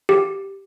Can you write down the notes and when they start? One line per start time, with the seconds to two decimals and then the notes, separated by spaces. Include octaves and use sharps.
0.09 G4